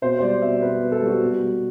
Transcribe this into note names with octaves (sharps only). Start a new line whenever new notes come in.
B2 C5
C5
G3 D5
B2 E5
B3 B4
B2
A4
G3 F#4
B2
G3